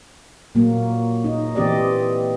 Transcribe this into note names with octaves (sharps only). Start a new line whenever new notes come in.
A#2 F#3 A#3
D#4
E3 C4 G4 D5 D#5